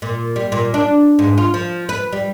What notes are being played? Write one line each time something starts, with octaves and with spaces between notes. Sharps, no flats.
A#2
G3
A#2
D4
G#2
F4
F3
B4
G3